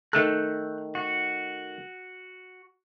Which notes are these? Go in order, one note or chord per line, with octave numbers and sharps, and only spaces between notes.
D#3 A3 A4 F#6 G6
F#4